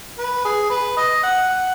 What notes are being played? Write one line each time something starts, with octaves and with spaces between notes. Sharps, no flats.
B4
G#4
B4
D#5
F#5
F#5